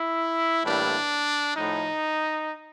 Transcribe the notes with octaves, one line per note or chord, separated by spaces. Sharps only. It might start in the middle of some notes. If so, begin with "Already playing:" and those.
Already playing: E4
A2 E3 G3 A#3 D4
A2 F3 A3 D#4